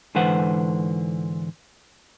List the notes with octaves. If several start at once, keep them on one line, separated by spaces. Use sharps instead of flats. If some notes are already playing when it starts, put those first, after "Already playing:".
G#2 D3 E3 B4 C5 F#5